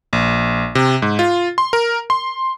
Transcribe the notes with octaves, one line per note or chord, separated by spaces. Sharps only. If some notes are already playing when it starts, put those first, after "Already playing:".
A#1
C3
G#2
F4
C6
A#4
C6